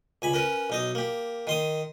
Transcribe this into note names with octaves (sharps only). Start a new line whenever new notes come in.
C#2 G#5 B5
C#4 A#4 B4
B1 D#4 D#5
A#3 G4
D#3 C6 D#6